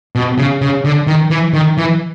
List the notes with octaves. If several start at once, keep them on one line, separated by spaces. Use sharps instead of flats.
B2
C#3
C#3
D3
D#3
E3
D#3
E3